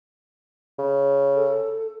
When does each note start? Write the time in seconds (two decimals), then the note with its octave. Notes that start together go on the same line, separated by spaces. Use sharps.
0.79 C#3
1.36 A4